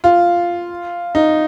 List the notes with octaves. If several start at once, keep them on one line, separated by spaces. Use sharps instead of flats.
F4
D#4